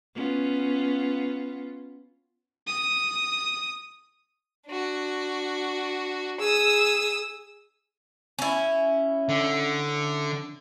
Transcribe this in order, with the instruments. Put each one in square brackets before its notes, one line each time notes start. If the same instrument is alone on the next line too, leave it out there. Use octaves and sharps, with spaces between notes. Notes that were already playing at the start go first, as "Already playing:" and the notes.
[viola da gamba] B3 C#4 F4
[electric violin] D#6
[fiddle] D4 F#4
[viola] G#4 [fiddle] D#6 E6
[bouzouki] C#4 E4
[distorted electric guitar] D3